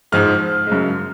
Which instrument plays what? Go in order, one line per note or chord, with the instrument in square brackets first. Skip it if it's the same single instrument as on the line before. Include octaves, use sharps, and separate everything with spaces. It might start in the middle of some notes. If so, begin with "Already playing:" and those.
[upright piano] G#2 F3 G#3 F6
F#2 C#3 G#3